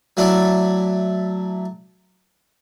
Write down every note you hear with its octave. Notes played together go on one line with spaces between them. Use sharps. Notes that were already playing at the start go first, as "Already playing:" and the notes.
F#3 A3 D4 E4